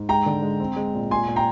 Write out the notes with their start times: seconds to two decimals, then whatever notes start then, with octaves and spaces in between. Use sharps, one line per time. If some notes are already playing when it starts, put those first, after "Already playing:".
Already playing: G#2
0.09 G#3 G5 A#5
0.26 D3
0.42 G#3
0.60 C4
0.76 G#3
0.94 A#2
1.11 A#2 G#5 C6
1.28 A#2
1.36 G5 A#5